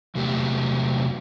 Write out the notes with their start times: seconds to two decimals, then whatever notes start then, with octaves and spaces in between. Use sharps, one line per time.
0.15 E2 C3 F#3 A3 G4